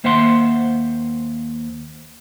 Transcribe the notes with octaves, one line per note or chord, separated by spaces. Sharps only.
D#2 A#3 C5 E5 F#5 C6